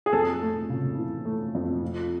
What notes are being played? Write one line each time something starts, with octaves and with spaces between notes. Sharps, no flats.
G#4
F2 A4
A3
C#3
E3
A3
F2
F3